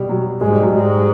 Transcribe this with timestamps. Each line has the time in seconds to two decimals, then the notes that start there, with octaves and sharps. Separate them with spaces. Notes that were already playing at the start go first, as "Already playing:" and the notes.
Already playing: B2 G3
0.09 F#3
0.41 G#2 G#3
0.52 G3
0.63 F#3
0.73 G#2 G3